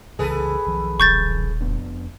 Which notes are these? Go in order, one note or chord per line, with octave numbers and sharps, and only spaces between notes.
C2 C#3 E3 G#4 A4 B4
B1 D#3 F3
D#1 C#6 G6 A6
F1 B3 D4